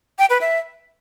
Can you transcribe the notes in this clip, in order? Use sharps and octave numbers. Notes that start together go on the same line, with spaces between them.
G5
B4
E5